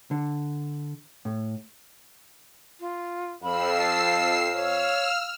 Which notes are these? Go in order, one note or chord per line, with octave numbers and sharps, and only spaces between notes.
D3
A2
F4
F2 F5 B5 E6 C7
A5
C#5 E6 F6